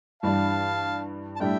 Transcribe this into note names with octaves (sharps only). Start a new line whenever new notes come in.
G2 E3 G3 D4 F5 A5
A5
A2 G3 D4 E5 G5